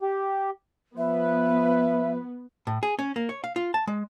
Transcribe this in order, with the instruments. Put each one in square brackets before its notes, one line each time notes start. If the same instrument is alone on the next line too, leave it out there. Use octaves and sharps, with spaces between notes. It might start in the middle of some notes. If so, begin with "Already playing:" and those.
[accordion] G4
[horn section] F3 B4 [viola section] B3 [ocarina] E5
[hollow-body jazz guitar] A2
G#4
C#4
A#3
C#5
F5
F4
A5
G#3